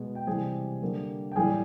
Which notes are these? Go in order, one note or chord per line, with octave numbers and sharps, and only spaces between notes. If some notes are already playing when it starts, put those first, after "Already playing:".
Already playing: B2 G#3 B3
G5
C3 E3 G3 G#4 G#5
D3 G3 A#3
G5
A2 E3 G3 G#4 G#5